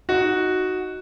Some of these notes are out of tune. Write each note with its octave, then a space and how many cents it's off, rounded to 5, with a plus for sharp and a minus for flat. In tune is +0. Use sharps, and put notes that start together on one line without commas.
D#4 +10 F#4 +0